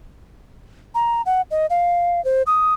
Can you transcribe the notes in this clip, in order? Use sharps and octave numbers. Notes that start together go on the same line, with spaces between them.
A#5
F#5
D#5
F5
C5
D#6